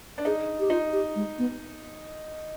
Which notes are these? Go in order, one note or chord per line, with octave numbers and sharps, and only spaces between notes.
D4
D#4 G#4
G4
D#4 F4
G4
G#3
B3